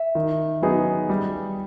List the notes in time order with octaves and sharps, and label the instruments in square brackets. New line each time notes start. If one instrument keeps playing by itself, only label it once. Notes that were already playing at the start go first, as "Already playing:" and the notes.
Already playing: [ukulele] E5
[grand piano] D#3
F#3 B3 D#4 G#4
G3